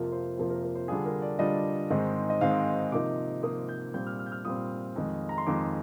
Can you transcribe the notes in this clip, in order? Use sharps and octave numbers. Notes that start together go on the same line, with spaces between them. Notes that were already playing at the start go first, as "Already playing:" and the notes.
Already playing: F2 C3 F3 A#3 F4 A#4
C5
F2 C3 F3 A#3 F4 C5
A#4
A#4
C5
D3 G3 D4 F4 G#4
A#4
D5
D3 G3 D4 F4 D#5
G#2 D#3 G#3 C4
D#5
G#2 D#3 G#3 C4 F5
C3 F3 A#3 D#4 D6
C3 F3 A#3 D#4 D#6
G6
A#2 G3 C4 G6
F6
F6
G6
F6
A#2 G3 C4 D#6
F2 D#3 G#3
A#5
C6
F2 D#3 G#3 D6